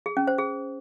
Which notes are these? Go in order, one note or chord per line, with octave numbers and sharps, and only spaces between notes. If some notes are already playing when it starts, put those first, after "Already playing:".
G#4
C#4
C5
G#4